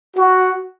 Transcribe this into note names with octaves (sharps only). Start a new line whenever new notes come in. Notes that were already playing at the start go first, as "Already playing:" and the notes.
F#4